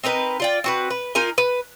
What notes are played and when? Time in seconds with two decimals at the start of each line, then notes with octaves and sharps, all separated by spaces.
0.03 C4 D#4 A#4 B4
0.40 F4 D5 G5
0.64 C4 F#4 B4
0.90 B4
1.15 D#4 F4 A#4 G#5
1.38 B4